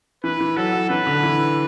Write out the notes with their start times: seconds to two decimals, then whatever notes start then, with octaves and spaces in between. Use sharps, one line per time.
0.24 E3 B4
0.41 E3
0.57 F#3 A4
0.73 F#3
0.90 E3 B4
1.07 D3
1.23 E3